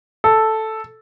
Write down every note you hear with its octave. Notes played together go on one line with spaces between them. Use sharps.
A4